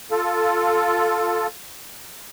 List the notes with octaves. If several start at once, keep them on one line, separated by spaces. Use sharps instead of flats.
F4 A4